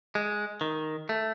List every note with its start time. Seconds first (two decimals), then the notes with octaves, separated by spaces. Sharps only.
0.15 G#3
0.61 D#3
1.09 A3